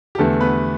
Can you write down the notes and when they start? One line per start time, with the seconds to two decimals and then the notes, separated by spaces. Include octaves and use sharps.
0.15 G4
0.18 E2 D3 A3 A4
0.41 B3 B4